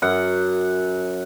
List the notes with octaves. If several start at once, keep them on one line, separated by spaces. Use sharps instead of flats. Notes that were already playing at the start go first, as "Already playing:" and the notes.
F#2 F#5